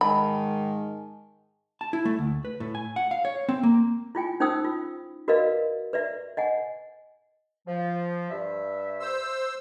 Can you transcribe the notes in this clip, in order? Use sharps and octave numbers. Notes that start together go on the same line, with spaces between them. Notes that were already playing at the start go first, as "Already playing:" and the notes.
G#2 D#3 D#5 G#5 A5 B5
A5
E4
A3
D2
B4
A2
G#5
F#5
F5
C#5
C4
A#3
E4 F4 G5 G#5
C#4 D#4 C5 G5 D#6 E6
F4
F#4 A#4 B4 D5 D#5 F5
B4 D5 E5
D#5 F#5 G#5
F3
G2 E5
C5 E6